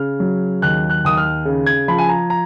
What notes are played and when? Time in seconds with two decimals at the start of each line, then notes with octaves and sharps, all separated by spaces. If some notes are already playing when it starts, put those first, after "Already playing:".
Already playing: C#3 F6
0.20 F#3
0.62 D#2 F#6
0.90 F#6
1.04 D#2 D#6
1.17 F6
1.45 C#3
1.66 G#6
1.88 F3 B5
1.98 G#5
2.09 A#5
2.30 A#5